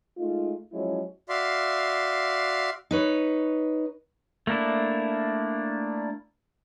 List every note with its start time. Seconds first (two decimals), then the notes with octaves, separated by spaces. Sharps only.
0.17 G#3 A3 D#4 F4
0.72 F3 F#3 G#3 C#4 E4
1.29 F#4 D5 E5 F5 C6
2.91 D#4 B4 C#5
4.47 A3 A#3 D4 E4